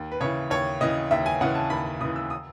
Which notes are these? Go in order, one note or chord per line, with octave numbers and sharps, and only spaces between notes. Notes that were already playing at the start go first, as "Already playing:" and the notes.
Already playing: D#2
B4
C#3 E3 C#5
D#2 C#5
C#3 E3 D#5
D#2 E5
G#5
C#3 E3 F#5
A5
D#2 B5
C#3 E3 D#6
E6
D#6